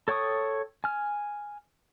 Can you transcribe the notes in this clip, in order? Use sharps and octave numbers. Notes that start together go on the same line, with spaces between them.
A4 C#5 G5 C#6 D#6
G#5 F6